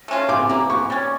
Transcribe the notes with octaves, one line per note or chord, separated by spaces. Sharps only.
A3 C#4 F4
E3 D6
A#3 E4
E3 C#6
G3 C#4